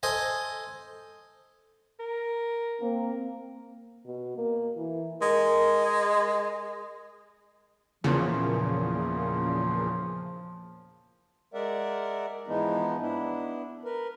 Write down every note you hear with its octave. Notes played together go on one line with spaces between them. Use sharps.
A4 C5 D#5 G#5
A#4
A#3 C4
B2
A#3
E3
G#3 A#4
E2 A#2 C#3 F3
G#3 A#4 D5 E5 F#5
G#2 E3 F3 G#3 B3 D#4
B3 D4 E4
A#4 B4